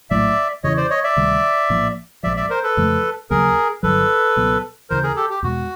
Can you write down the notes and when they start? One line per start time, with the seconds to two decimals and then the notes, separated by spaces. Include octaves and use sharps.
0.10 A#1 A2 F#3 A3 D5 E5
0.63 E2 C#3 E3 C#5 D#5
0.77 C5 D5
0.90 C#5 D#5
1.04 D5 E5
1.16 D2 C3 D#3 G3
1.70 A#1 A2 F3 A#3
2.23 A#1 G#2 F3 D5 E5
2.37 D5 E5
2.50 A#4 C5
2.63 A4 B4
2.77 F2 C#3 F3 A3
3.30 D#2 C#3 F#3 A#3 G#4 A#4
3.83 G1 G2 D3 F#3 A4 B4
4.36 C#2 B2 F#3 B3
4.90 D#2 C#3 E3 A#4 C5
5.03 G#4 A#4
5.16 G4 A4
5.30 G4
5.43 E2 B2 G#3 F#4